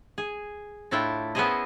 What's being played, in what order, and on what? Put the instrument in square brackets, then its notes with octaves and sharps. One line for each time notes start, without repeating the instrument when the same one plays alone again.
[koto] G#4
A2 A3 D4 E4 F4 G5
B3 C#4 E4 G#4 C5 D#5